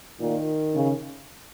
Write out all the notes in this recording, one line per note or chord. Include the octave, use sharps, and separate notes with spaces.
A#2 D#3
C#3